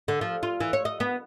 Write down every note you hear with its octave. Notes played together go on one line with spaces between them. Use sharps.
D3
F3
F4
E3
C#5
D#5
B3